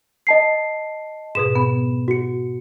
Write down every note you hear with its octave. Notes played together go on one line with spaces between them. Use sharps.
D#5 A5 C7
G#2 B2 G#4 E7
B3
F#4 C#7